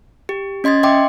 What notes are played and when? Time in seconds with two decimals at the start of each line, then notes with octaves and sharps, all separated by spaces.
0.29 G4
0.64 C#4 D#5 C6 G#6 A6
0.83 D#5 E5 G5 C6 D6